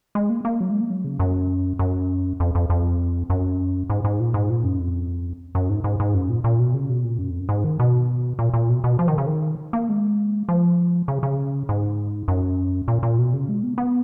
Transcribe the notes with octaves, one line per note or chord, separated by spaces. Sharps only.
G#3
A#3
A#3
F#3
G#3
A#3
F#3
C#3
F#2
F#2
F2
F2
F2
F#2
G#2
G#2
A#2
G#2
A#2
F#2
F2
F#2
G#2
G#2
G#2
F#2
A#2
A#2
B2
C#3
B2
A#2
F#2
F2
F#2
G#2
D#3
B2
A#2
A#2
B2
B2
F3
D#3
C#3
D#3
A#3
G#3
F3
C#3
C#3
G#2
F#2
A#2
A#2
B2
C#3
G#3
B3
B3